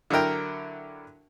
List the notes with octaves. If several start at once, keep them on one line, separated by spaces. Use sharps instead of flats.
D3 F#3 E4 A#4 G5